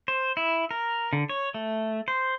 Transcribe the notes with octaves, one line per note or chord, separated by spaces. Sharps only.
C5
E4
A#4
D3
C#5
A3
C5